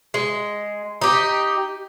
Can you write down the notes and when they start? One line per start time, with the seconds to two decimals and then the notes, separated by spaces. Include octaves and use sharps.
0.14 G#3
1.01 D#4 G4